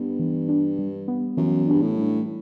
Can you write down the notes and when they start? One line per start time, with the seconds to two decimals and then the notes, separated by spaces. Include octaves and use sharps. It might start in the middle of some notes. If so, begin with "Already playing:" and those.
Already playing: G2 B3
0.19 E3
0.49 D4
0.79 G3
1.08 B3
1.37 F#2 E3
1.67 G2 D4
1.82 A2
1.97 G3